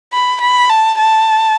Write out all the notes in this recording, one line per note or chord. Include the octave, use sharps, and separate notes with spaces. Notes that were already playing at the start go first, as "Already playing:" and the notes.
B5
B5
A5
A5